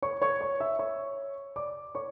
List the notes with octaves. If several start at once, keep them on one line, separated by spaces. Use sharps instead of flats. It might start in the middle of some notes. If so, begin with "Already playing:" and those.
C#5 C#6
C#5 C#6
C#5 C#6
E5 E6
C#5 C#6
D5 D6
C#5 C#6